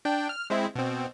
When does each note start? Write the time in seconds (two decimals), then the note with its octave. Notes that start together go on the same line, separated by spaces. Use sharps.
0.05 D4 G5
0.29 F6
0.50 G#3 C4 E4
0.76 B2 C4